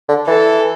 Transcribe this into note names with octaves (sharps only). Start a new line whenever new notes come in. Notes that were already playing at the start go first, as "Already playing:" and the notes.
D3
E3 A4